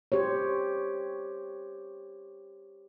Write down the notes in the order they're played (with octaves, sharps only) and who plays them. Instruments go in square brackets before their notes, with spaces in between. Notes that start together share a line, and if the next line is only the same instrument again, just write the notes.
[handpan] G4 C5 C#5